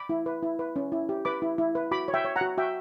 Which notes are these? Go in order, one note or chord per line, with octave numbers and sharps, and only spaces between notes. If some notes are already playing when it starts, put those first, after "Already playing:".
Already playing: B5 D6
E4
B4
E4
B4
C#4
E4
G4
B4 B5 D6
E4
E4
B4
F#4 B5 D6
C#5
E5 G5
C#5
F#5 A#5
F#4
F#4 E5 G5